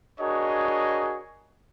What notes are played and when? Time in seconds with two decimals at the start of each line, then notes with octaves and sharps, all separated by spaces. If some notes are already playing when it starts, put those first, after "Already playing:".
0.20 D4 F#4 G#4 A#4 C#5 D#5